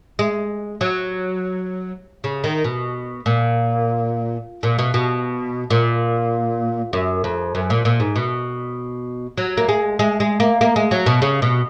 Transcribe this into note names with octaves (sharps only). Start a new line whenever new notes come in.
G#3
F#3
C#3
D#3
B2
A#2
A#2
B2
B2
A#2
F#2
F2
F#2
A#2
A#2
G#2
B2
F#3
A#3
G#3
G#3
G#3
A#3
A#3
G#3
F#3
B2
C#3
B2